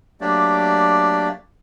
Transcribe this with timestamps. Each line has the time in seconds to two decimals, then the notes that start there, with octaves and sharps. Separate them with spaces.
0.21 F#3 A3 A#3 D4 G4 D5